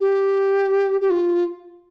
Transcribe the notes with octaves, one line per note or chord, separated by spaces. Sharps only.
G4
G4
F4